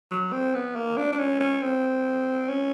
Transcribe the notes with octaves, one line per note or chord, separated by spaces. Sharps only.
F#3
C4
B3
A#3
D4
D4
C#4
C#4
C4
C#4